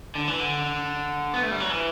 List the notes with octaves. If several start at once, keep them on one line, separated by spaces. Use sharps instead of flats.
D3
E3
D3
B3
A3
G3
F#3
E3